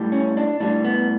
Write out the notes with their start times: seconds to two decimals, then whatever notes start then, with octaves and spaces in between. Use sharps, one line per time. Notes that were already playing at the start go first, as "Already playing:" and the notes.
Already playing: A2 G3
0.12 C#4
0.37 D4
0.60 A2 G3 D4
0.85 B3